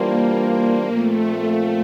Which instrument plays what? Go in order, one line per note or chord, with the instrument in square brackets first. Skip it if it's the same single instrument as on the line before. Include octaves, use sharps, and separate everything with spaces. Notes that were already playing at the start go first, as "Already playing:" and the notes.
Already playing: [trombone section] E3 G3 D4 F4 C5 [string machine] A#3
[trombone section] A#2 F3 C4 F4 [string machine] A3